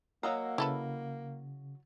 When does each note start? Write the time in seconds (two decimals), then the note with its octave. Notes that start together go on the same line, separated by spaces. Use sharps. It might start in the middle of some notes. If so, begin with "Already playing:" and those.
0.23 F#3 A#3 D#5 F5 F#5 A#5 E6
0.58 C#3 E4 A4 B4